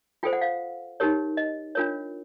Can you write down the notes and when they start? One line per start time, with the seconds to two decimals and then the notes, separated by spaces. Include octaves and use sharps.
0.23 F4 A4 C5 G5
0.33 F#5
0.41 F5
1.00 D#4 G4 A#4 C#5
1.37 D#5
1.75 D4 F4 A#4 C#5